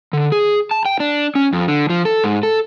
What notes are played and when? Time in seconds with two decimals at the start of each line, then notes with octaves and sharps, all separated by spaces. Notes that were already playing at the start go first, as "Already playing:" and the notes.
0.13 D3
0.32 G#4
0.71 A5
0.85 G5
1.00 D4
1.35 C#4
1.53 F2
1.68 D3
1.90 F3
2.05 A4
2.24 G#2
2.43 A4